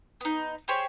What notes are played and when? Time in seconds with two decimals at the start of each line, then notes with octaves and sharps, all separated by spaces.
0.21 B3 D#4
0.68 G4 G#4 C5 C#5